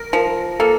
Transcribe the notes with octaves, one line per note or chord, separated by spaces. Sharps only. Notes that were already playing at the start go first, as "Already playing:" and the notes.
Already playing: A#4
F3
A#3 A4